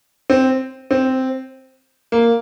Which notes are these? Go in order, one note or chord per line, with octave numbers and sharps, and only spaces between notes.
C4
C4
A#3